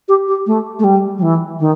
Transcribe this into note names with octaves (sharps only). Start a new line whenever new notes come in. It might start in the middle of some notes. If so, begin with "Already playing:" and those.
G4
G4
A3
A3
G3
F#3
E3
D#3